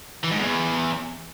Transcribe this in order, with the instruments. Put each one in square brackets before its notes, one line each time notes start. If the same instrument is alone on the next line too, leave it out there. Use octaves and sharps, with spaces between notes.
[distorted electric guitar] E3
G#2
E2